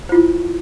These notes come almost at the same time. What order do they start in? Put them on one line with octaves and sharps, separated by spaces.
C5 F4 E4